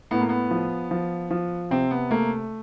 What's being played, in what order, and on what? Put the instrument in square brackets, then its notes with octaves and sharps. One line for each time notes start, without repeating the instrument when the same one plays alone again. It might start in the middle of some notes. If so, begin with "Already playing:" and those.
[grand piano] A2 [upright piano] B3
[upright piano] A#3
B3
[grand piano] F3
F3
F3
[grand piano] C3 [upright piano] C4
[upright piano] B3
[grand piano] A3 [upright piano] A#3